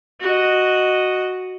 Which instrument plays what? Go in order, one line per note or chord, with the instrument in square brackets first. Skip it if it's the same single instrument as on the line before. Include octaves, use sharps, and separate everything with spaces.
[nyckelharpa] F#4 D#5